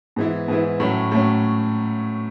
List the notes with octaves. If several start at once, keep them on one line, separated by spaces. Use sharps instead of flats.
G#2 E3 B3 E4
G#2 E3 B3 E4
A2 F#3 A3 C#4
A2 F#3 A3 C#4